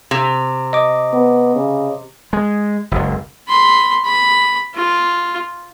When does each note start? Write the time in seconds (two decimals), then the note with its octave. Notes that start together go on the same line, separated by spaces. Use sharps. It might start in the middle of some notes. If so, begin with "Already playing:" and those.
0.11 C3
0.73 D#5 D6
1.13 B3
1.55 C#3
2.33 G#3
2.91 F#1 C#2
3.48 B5 C6
4.04 B5
4.75 F4